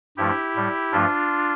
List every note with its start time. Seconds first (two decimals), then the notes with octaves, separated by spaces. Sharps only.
0.17 G2 F3 A3 E4 G4
0.55 A2 G3
0.92 G2 F3 A3 D4 F4